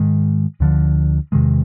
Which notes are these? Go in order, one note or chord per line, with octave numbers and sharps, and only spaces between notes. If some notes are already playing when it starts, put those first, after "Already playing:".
Already playing: G#2 D#3 G#3
D2 D3 F3
E2 C3 D#3 G#3